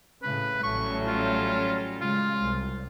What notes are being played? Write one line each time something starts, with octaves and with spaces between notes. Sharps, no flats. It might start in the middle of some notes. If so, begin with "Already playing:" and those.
A2 C#3 B4
A1 F#3 G3 A3 C#4 C#6
F4
C#3 G#3 F4
C2